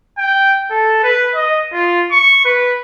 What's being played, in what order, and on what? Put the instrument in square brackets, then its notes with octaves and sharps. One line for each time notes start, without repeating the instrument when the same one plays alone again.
[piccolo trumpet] G5
A4
B4
D#5
F4
C#6
B4